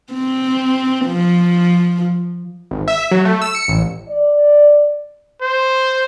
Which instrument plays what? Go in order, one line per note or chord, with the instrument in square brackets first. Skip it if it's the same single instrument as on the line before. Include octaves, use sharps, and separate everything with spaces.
[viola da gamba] C4
F3
[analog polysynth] G#1
E5
F#3
A3
E6
C#7
A1
[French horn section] D5
[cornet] C5